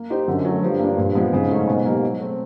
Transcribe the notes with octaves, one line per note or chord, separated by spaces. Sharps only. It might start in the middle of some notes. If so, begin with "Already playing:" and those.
Already playing: A#3
D#4 G4 C5
F#2 D3
F#3 A3
G2 F3
A#3 D4
A#2
F3 G#3 B3
G#2 C#3
F#3 A3 C#4
B2
G3 A#3
F#3
A3 C4